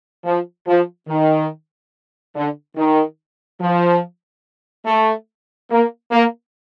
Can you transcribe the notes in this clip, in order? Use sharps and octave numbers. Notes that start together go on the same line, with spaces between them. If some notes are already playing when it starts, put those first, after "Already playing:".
F3
F3
D#3
D3
D#3
F3
A3
A#3
A#3